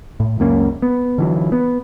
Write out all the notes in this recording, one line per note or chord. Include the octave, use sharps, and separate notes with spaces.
A2
C#2 F#2 A#3 C#4
B3
D3 E3 F#3
B3